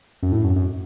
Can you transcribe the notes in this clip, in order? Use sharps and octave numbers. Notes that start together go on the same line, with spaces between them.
F#2
A2
F#2
F#2